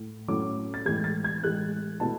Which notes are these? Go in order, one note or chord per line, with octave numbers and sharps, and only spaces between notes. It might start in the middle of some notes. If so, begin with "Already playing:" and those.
Already playing: A2
A2 F#3 A3 C#4 E4 D6
A6
A2 E3 G#3 G#6
A6
G#6
A2 E3 G#3 F#6
B2 A3 E4 A5